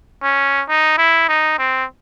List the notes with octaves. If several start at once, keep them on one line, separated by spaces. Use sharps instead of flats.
C#4
D#4
E4
D#4
C4